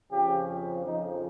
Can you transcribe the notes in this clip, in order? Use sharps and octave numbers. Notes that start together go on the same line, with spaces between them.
F2 C#3 F3 G4
F2 C#3 F3 D#4